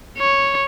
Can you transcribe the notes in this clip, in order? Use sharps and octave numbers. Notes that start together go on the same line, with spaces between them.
C#5